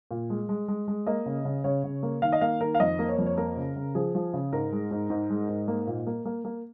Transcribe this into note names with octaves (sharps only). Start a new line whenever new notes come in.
A#2
G#3
G#3
G#3
G#3
A#3 D#5
C#3
C#3
C#3 C#5
C#3
A#3
D#3 F5
D#5
A#3 F5
D#3 A#4
F5
F2 D#5
A#3
C#5
F2
C#5
A#3 A#4
C#3
C#3
F3 G#4
F3
C#3
G#2 A#4
G#3
G#2
G#2
G#3
G#2
A#3
A#2
A#3
A#3
A#3